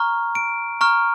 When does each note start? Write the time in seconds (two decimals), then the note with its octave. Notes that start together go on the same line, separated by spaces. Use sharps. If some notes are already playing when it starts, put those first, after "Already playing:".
Already playing: A#5 C#6 F6
0.35 D7
0.81 A#5 C#6 F6